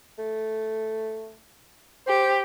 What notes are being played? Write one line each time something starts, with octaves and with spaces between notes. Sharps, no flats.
A3
G4 C5